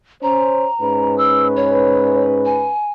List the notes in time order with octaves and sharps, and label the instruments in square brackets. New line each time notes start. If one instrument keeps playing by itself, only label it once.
[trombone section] C#4 C5 [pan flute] A#5
[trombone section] G#2 C#4 B4
[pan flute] E6
C#5
G#5